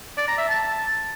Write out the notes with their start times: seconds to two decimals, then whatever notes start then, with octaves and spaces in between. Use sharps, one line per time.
0.18 D5
0.28 A#5
0.38 E5
0.49 A5